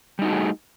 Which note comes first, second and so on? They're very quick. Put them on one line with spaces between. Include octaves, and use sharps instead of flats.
G3 D#4 F#4 A3 G#4